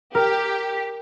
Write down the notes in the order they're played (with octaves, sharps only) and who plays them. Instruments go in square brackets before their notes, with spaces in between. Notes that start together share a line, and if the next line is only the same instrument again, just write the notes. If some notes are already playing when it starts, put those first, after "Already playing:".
[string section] G4 [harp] A#4